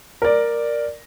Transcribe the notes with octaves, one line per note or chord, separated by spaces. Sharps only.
A#4 D5